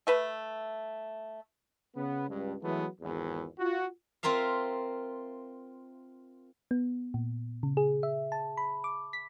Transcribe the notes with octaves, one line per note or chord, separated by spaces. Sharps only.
A3 B4 E5
C#3 B3
C#2 G2
E3 F#3 G#3 A3 B3
G#1 E2
F4 F#4
C4 F4 A#4 E5 F5
B3
A#2
C#3
G#4
E5
A5
B5
D6
B6